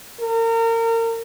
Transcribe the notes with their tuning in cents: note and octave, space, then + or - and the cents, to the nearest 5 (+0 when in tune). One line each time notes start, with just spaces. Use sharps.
A#4 -30